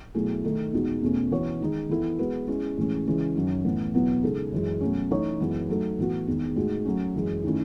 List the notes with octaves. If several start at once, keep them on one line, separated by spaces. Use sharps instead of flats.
B2 F#3 A3 E4 G#4
D#3 A3 D#4 A4
E2 B2 G#3 D#4 F#4
E2 B2 A3 C#4
E3 B3 F#4 C#5
D#3 G#3 D#4
E3 B3 E4 A4
G#3 B3 F#4 B4
G#3 C#4 E4
A2 E3 G#3 C#4
C#3 E3 G#3 C#4
F#2 D#3 F#3 C#4
A2 E3 B3
E2 B2 F#3 B3 E4
C#3 G#3 D#4 A4
F#2 E3 G#3
B2 F#3 A3 C#4
E3 A3 D#4 A4 C#5
F#2 E3 G#3 B3
F#3 A3 D#4 A4
A2 E3 B3 F#4
E2 D#3 G#3
A2 G#3 D#4 F#4
F#3 A3 C#4
F#2 E3 G#3
D#3 A3 C#4 E4